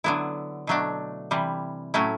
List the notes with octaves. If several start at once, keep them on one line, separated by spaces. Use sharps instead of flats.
D3 F#3 B3 E4
B2 F#3 A3 D4
C3 E3 G3
A2 F#3 A3 C#4 E4